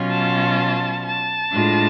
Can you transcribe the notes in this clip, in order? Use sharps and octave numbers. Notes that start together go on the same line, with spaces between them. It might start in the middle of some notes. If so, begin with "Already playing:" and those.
Already playing: B2 F#3 C#4 F4
A5
A5
A2 G#3 D4 F4